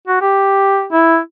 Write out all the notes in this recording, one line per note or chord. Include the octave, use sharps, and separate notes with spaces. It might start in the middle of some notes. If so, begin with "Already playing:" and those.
F#4
G4
E4